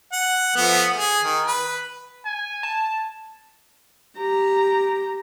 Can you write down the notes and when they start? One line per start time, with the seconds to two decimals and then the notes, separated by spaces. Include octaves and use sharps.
0.13 F#5
0.56 F3 A3 B3
0.96 G#4
1.22 D#3
1.47 B4
2.25 G#5
2.63 A5
4.18 G4 A#5